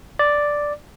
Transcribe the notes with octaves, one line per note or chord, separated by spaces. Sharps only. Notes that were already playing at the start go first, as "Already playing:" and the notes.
D5